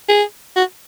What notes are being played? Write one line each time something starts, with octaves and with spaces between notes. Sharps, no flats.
G#4
F#4